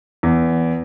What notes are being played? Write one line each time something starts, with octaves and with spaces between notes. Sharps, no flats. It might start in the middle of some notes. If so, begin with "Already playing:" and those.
E2